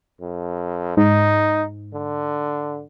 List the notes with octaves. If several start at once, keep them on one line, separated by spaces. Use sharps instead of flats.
F2
G#2 D#4
D3